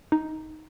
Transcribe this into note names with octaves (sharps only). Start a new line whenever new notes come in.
D#4